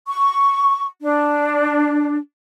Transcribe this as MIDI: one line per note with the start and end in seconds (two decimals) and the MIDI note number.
0.08 0.86 85
1.01 2.17 62